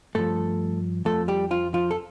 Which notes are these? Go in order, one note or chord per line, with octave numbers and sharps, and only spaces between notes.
G2 F3 A3 A4
F2 F3 A3 A4
G3 G4
F3 F4
F3 F4
A4